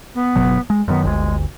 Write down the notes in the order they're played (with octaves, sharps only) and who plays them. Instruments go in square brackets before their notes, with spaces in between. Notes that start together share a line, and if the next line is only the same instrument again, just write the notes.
[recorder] B3
[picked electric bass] F#1 B2 F#3
G#3
[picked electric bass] F#2 D#3 [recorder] B3
[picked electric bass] G1 D2 [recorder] G#3